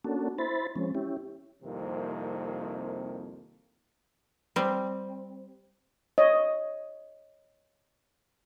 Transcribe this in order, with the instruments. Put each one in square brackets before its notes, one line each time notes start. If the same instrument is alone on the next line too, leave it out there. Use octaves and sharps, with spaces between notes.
[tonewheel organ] A#3 C#4 D4 F#4 A4
E4 C5 B5 A6
F3 G#3 C4 C#4
C#4 E4 G4
[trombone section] C2 F2 C3 D#3 A#3
[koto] G3 C4
[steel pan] C#5 D#5